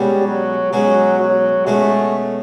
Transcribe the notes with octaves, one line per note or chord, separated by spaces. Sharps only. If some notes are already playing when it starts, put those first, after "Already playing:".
Already playing: B2 G3 G#3 C#4 F#4
F#3
B2 F#3 G#3 C#4 F#4
F#3
B2 G#3 A3 C#4 F#4